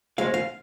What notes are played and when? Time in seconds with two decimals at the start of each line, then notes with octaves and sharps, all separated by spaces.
0.18 D#2 C#3 F3 G#3 F5
0.34 F5